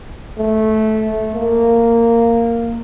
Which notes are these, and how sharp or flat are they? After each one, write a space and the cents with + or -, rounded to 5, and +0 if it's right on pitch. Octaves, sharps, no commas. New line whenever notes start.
A3 -15
A#3 -10